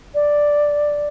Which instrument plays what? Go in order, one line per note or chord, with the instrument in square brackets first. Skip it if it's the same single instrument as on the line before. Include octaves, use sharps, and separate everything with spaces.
[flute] D5